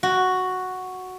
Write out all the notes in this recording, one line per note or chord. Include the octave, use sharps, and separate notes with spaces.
F#4